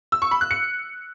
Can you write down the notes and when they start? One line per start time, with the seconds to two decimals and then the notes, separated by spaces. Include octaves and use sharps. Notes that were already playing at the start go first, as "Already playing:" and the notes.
0.12 E6
0.22 C#6
0.31 B5
0.41 F#6
0.51 C#7